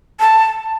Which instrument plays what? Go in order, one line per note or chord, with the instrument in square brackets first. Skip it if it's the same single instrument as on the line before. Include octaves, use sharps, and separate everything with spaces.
[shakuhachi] A5